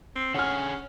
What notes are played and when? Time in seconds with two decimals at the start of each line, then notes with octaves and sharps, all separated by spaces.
0.16 C4
0.34 D3 C#4 G#4 F#5 G#5 F6